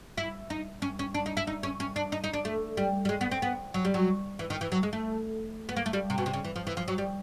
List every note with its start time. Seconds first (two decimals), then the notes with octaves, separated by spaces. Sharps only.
0.18 E4
0.50 D#4
0.82 C#4
0.99 C#4
1.15 D4
1.26 D#4
1.37 E4
1.47 D#4
1.63 C#4
1.80 C#4
1.96 D4
2.12 D#4
2.24 D#4
2.33 D4
2.45 A3
2.77 G3
3.05 G3
3.09 G#3
3.21 B3
3.31 C4
3.42 B3
3.74 F#3
3.85 G3
3.94 F#3
4.39 E3
4.50 D#3
4.61 E3
4.72 F#3
4.83 G#3
4.93 A3
5.69 B3
5.77 A#3
5.86 A3
5.93 G3
6.10 C3
6.18 B2
6.26 C3
6.33 C#3
6.44 E3
6.56 F3
6.67 E3
6.77 F3
6.88 F#3
6.98 G3